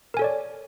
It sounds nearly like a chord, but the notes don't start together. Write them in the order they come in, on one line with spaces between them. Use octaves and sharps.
A#4 G#5 A4 C#5 D5